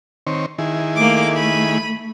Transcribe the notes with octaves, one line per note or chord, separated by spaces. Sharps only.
D#3 C4 C#5
D#3 E4 G#4
A3 A#3 D6
B5 D#7